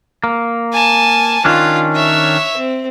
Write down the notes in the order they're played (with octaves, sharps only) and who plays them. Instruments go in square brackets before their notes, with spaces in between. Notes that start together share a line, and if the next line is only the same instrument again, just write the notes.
[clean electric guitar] A#3
[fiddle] G#5 A5
[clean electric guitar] D#3 C#4 D4 [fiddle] F4
[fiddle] C#5 E5
C4